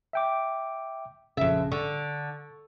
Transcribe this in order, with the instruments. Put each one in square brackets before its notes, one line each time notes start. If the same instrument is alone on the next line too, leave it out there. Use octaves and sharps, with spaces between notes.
[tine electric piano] E5 G5 D6
[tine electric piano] A#1 C#3 [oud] F2 E5
[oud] D3 [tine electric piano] C#6